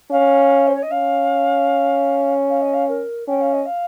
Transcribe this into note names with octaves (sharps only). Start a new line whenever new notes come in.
C#4 F5
C5
C#5
D#5
C#4 F5
F5
D#5
F5
A#4
C#4 G5
F5
D#5
F5